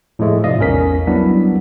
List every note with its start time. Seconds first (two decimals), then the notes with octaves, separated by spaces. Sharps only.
0.19 A2 F3 G#3 A3
0.44 G#2 C3 F3 D5 D#5 F5
0.59 A#1 E2 C#4 A#4 B6
1.07 F#3 G3 B3 D4 E4